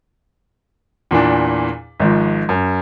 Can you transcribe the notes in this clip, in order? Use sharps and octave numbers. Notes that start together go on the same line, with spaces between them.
E2 A#2 E3 D4
G#1 G#2 F3
F#2